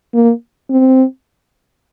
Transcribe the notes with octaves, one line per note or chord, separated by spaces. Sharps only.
A#3
C4